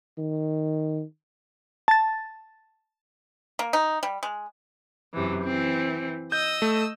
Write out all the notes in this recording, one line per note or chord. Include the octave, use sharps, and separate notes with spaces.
D#3
A5 A6
A#3
D#4
G3
G#3
F#2 C3 E3
E3 C4
D#5 E6 G6
A3